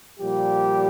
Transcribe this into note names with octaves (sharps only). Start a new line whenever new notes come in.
A#2 F3 G3 G4